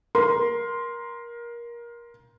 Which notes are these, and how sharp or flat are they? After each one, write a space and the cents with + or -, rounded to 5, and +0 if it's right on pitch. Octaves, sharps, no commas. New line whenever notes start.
A#4 +20 C6 -5